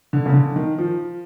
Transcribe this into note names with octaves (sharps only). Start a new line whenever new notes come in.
D3
C#3
D3
D#3
F3